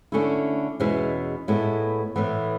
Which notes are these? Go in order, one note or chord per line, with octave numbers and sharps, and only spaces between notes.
D3 A3 C#4 E4
E2 B2 G#3 C#4 E4
A2 G#3 B3 E4
A2 E3 B3